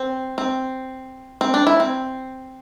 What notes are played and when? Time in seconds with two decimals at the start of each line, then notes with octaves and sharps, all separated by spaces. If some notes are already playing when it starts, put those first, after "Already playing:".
Already playing: C4
0.38 C4
1.41 C4
1.54 D4
1.67 E4
1.80 C4